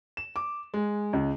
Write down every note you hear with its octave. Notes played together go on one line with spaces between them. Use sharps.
E7
D6
G#3
C#2